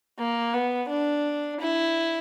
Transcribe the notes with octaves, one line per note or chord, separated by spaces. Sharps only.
A#3
B3
D4
E4